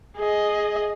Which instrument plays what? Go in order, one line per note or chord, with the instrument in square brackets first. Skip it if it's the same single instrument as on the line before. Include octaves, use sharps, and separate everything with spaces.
[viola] G#4 D#5